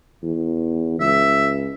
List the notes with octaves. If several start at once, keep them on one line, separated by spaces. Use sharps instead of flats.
E2
C#2 E5